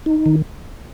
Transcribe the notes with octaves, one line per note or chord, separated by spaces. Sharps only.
D#4
D#3